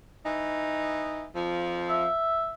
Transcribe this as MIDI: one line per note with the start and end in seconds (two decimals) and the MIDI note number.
0.25 1.25 52
0.25 1.25 63
1.35 2.07 41
1.35 2.07 53
1.89 2.53 76